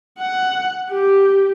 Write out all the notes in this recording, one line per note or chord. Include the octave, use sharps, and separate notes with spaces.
F#5
G4